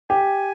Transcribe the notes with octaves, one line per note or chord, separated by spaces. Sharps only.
G4 G#5